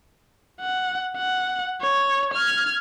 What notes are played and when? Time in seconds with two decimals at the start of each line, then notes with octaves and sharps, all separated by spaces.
0.60 F#5
1.16 F#5
1.82 C#5
2.34 F6 G#6